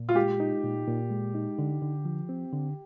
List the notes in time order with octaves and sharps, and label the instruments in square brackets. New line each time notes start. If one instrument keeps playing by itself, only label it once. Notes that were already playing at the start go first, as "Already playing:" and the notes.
Already playing: [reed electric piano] A#2
[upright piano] F4
[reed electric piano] G#3 [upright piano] G4
[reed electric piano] D#4
A#2
A#2
G#3
D#4
D3
D3
F3
C4
D3